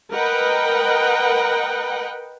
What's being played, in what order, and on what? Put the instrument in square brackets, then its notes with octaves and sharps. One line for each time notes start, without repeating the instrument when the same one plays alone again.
[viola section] A#4 B4 D#5 F#5 G5